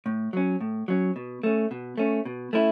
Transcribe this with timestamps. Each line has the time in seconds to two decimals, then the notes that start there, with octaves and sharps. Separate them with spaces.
0.06 A2
0.33 F#3 C#4
0.61 A2
0.88 F#3 C#4
1.16 B2
1.43 A3 C#4
1.71 B2
1.98 A3 C#4
2.25 B2
2.53 A3 C#4 E4